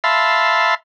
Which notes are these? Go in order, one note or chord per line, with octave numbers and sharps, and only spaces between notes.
E5 F5 A5 B5 C6